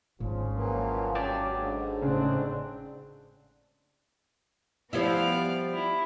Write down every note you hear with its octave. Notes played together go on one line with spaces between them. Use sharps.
G#1 C#3 F3
E3 F#3 A#3
D#2 C#3 F#3 C#4 D5 G5 A5 D6
G#2 D3
A2 C#3 C4 D4 G#4
F3 G3 B3 E4 D5 F5
E4